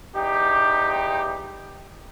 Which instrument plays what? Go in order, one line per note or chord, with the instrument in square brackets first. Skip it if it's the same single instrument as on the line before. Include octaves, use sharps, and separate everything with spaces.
[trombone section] E2 D#4 G4